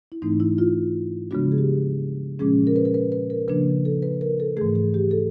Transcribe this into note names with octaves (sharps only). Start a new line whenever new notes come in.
E4
G#2 E3 A3 C4 D#4
E4
F4
C#3 F3 G#3 B3 D4 F#4
G#4
G4
A#2 F3 G#3 C#4 G#4
A#4
B4
A#4
B4
B4
A#4
C#3 F3 A#3 D4 B4
A4
B4
A#4
A4
G#2 E3 A3 G#4
G#4
G4
A4